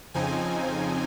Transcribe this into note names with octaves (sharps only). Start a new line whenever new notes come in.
F2 C#3 F3 C4 D#4 G#5